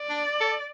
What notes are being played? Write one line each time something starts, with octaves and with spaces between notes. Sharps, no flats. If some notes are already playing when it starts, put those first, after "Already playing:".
Already playing: D5
D4
A4